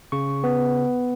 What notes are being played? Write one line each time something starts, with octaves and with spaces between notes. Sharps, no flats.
C#3 C#6
B3